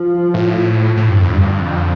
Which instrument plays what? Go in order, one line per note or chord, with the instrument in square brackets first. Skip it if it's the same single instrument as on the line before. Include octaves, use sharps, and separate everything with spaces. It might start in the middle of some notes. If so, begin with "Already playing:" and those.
Already playing: [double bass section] F3
[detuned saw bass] A2
[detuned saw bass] A2 [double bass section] D3
[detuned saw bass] G2
F2
G2
F2